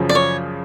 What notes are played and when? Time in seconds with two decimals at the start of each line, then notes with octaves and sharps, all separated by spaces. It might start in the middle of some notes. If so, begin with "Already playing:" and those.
Already playing: F#2 C#3 F3
0.09 D5
0.15 C#5